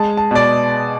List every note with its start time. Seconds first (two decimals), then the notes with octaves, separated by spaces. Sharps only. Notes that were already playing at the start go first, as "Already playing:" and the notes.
Already playing: G#3 A5
0.17 A5
0.31 B2 D5